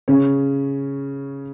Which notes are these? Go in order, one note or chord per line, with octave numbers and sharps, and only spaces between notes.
C#3 C#4